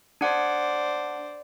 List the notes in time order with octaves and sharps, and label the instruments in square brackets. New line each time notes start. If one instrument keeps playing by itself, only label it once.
[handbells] D4 F#5 [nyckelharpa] C5 D5